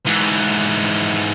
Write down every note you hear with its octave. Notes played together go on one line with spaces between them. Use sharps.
G#2 E3